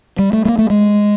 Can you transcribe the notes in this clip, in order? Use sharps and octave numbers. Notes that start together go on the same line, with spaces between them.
G3
A3
A3
A#3
A3
G#3